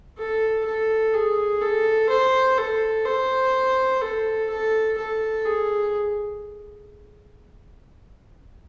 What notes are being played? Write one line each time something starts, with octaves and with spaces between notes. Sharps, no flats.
A4
A4
G#4
A4
C5
A4
C5
A4
A4
A4
G#4